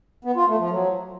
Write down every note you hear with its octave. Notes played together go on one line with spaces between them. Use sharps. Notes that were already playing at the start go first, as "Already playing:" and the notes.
B3
F4
A3
F3
F#3